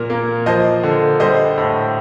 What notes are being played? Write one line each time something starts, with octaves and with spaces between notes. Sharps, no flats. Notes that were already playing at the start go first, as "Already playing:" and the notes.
Already playing: A#2 A#4
A#3
F3 C5 D#5
D3
G3 C5 D#5
A2